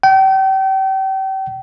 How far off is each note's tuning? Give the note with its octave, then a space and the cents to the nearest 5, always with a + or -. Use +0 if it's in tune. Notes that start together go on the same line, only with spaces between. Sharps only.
G5 -35